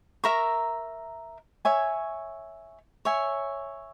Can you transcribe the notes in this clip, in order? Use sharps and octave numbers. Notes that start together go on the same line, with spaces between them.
A#4 E5 A#5 C#6
C#5 E5 G#5 C#6
C#5 E5 G#5